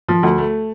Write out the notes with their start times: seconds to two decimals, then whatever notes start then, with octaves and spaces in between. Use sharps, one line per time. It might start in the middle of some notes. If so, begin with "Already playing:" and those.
0.08 F3
0.23 D2
0.38 A3